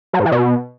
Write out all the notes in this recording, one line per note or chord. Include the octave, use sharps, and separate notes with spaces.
F#3
G#2
E3
B2